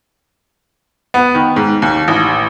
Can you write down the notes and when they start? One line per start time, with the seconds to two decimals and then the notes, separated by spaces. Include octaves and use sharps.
1.14 B3
1.35 D#3
1.56 G#2
1.82 D#2
2.08 A1